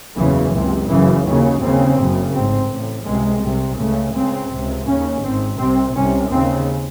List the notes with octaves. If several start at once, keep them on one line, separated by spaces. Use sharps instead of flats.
F#1 E2 C#3 E3
C#2 C3
F#1 F#2 C#3 E3
D#2 C#3 F#3
D#2 C#3 C4
F#1 F#2 C#3
A1 G#2 C4
A1 A2
C#2 C3 G#3
C2 C3
C#2 C#3 A3
C#2 C#3 C4
C#2 C3
D#2 C#3 C#4
G#1 G#2 C4
C2 C3 C4
C2 C3 C#4
D#2 C#3 C4